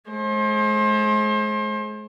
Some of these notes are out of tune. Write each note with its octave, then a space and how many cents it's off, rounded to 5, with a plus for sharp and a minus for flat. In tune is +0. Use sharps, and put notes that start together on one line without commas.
G#3 +40 C5 +35